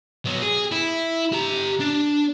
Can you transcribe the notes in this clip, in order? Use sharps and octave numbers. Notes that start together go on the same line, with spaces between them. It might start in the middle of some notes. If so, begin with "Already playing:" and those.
B2 F#3
G#4
E4
G4 A#5
D4